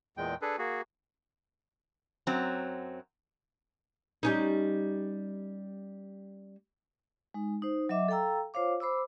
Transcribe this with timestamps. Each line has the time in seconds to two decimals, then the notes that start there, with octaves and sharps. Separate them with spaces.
0.17 E2 A#2 G#3 G5
0.42 D4 G#4 A4 B4
0.58 A#3 F#4 G#4
2.27 F#2 F#3 C4
4.23 G3 C#4 D#4
7.34 G#3 D#4
7.62 D#4 C5
7.89 F#3 D#5 E5 D6
8.08 A4 F5 G5 A#5 E6
8.54 F4 C5 C#5 F5 D6
8.80 C5 B5 D6 E6